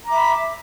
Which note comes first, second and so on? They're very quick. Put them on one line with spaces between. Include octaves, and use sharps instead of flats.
A#5 D6 E5 B5